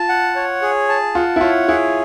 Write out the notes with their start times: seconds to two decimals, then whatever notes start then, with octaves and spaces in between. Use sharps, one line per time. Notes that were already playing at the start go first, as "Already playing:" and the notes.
Already playing: F4 A5
0.09 F#5
0.36 C#5
0.62 G#4
0.89 A5
1.15 F4 F#5
1.36 E4
1.41 F4 C#5
1.68 E4 G#4